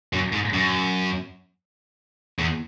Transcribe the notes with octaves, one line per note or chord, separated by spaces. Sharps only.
F#2
G#2
F#2
E2